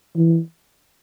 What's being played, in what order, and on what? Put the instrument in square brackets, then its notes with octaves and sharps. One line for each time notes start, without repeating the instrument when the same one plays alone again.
[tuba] E3